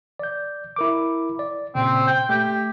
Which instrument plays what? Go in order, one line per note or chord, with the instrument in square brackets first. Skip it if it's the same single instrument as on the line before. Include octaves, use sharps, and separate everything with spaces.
[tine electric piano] D5 G6
E4 A#4 D6
D5
[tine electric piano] A#2 C#3 [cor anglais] C4
[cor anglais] G5
[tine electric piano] A3 [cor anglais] G4